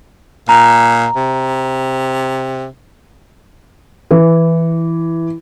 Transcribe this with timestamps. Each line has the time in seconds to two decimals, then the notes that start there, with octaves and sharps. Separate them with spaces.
0.49 A#2 A#5
1.16 C3
4.11 E3